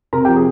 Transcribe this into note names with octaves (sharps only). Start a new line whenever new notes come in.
C3 A#4 A#5
G4 G5
F3
G#4